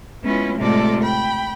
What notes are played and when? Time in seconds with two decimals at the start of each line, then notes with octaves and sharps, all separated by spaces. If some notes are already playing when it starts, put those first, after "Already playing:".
0.22 G#3 B3 C#4 E4 F4
0.57 A2 C3 G#3 F4 A4 D5
1.02 G5 B5